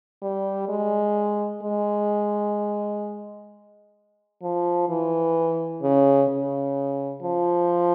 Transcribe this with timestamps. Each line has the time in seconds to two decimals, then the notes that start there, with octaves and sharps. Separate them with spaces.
0.22 G3
0.69 G#3
1.62 G#3
4.43 F3
4.89 E3
5.82 C#3
6.29 C#3
7.23 F3